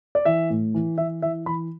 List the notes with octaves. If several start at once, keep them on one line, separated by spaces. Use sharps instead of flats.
D5
E3 E5
A2
E3
E3 E5
E3 E5
E3 B5